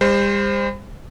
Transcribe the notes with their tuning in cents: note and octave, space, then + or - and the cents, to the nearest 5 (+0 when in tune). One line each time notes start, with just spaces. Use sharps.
G3 +45 C5 +0